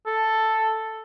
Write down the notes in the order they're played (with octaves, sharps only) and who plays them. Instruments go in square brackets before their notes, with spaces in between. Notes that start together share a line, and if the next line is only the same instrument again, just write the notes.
[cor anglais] A4